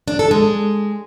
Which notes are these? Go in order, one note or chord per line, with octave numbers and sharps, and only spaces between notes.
D4
A4
G#3